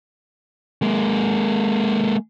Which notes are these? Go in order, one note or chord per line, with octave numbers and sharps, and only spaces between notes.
G#3 A#3